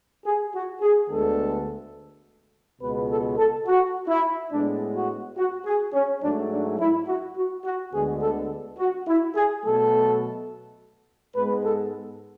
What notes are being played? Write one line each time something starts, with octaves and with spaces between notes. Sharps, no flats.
G#4
F#4
G#4
D2 D3 G#3 B3 A4
C#2 B2 G#3 B3 B4
A4
A4
F#4
E4
A2 G#3 B3 D4
F#4
F#4
G#4
C#4
G#2 F#3 A3 D4
D4
E4
F#4
F#4
F#4
D2 D3 G#3 B3 G#4
A4
F#4
E4
G#4
B2 F#3 A3 A4
G#2 G#3 B3 B4
A4